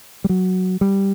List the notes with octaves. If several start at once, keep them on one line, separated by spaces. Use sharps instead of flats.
G3
F#3
G3